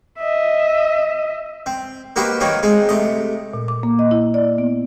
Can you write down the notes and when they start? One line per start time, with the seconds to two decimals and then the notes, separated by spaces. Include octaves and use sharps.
0.18 D#5 E5
1.66 C4
2.16 A#3 D#4 F#4 G4 B4 C5
2.40 D#3 F#3 A#3 C4 D#4 C#5
2.63 G#3 C4 D#4
2.89 C3 A3 D#5
3.53 A#2
3.68 D6
3.83 A#3
3.99 D#5
4.11 E4
4.34 D5
4.58 B3